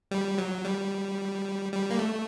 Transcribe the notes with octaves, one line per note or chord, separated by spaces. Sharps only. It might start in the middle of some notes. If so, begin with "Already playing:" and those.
G3
F#3
G3
G3
A#3
A3